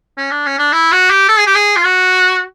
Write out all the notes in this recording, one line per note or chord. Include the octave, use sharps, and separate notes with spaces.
C#4
D4
C#4
D4
E4
F#4
G4
A4
G#4
G4
G#4
F4
F#4